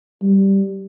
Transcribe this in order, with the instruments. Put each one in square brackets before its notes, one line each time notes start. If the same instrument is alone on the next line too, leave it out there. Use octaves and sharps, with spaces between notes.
[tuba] G3